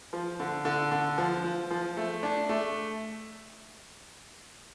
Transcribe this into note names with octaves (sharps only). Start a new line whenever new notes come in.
F3
D3
D3
D3
F3
F3
F3
A3
D4
A3